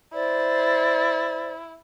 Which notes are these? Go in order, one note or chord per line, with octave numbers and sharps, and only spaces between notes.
E4 C5 D5